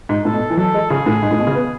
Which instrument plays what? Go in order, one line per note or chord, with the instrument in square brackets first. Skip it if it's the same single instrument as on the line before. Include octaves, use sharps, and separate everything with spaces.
[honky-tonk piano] G#2
[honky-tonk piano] A2 [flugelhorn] A4
[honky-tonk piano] B2
E3
[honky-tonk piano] F#3 [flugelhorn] A4
[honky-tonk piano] G#3
[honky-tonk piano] C#3 [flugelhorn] G#4
[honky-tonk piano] A2
G#2
A2
B2
C#3
B3